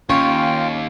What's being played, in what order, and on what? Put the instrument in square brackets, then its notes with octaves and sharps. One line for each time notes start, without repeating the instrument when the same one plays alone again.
[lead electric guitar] D#2 [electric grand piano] C#4 [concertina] F4 G5 [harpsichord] C#5